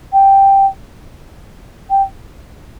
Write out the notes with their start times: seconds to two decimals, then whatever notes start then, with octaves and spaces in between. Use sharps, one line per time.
0.13 G5
1.90 G5